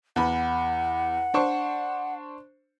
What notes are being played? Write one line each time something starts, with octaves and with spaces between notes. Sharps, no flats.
E2 F#5 B5
D4 C5 C#6